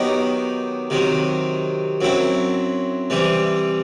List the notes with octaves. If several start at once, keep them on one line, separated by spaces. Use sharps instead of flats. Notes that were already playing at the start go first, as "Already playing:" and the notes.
Already playing: D#3 F#3 B3 D#4 G4
C3 D#3 F#3
F#2 F#3 C4 E4
C3 E3 G3